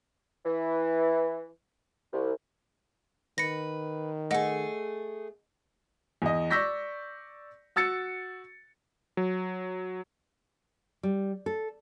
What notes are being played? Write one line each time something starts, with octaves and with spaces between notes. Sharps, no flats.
E3
C2
D#3 B4 A#6 C#7
A3 G#4 D#5 F#5
E2 D#5
D5 C#6 E6 G6 A#6 B6
F#4 E6 A6 C#7
F#3
G3
A4